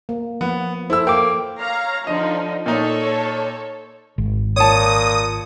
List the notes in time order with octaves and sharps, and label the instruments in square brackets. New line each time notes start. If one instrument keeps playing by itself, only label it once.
[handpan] A#3
[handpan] F3 [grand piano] B3
[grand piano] E4 E6 [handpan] A4 C5
[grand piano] A#3 [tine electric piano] G5 D6
[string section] C#5 F5 A#5
[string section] D3 F3 D#4 [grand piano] D#5
[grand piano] A#2 D#4 [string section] A4 C#5
[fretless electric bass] G#1
[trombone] A#2 [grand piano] C#5 A5 [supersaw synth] D#6